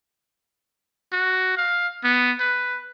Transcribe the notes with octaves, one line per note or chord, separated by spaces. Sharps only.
F#4
F5
B3
B4